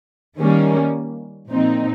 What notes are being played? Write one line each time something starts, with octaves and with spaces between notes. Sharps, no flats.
D#3 G3 A#3 C#4
A#2 F3 C4 D#4